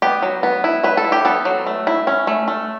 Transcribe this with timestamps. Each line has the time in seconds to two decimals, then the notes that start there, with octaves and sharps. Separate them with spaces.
0.02 B3 G4
0.22 F#3
0.43 B3
0.64 E4
0.83 F#3 B4
0.97 A4
1.04 E4
1.12 G4
1.25 B3 A4
1.45 F#3
1.66 A3
1.87 E4
2.07 C#4
2.27 A3
2.48 A3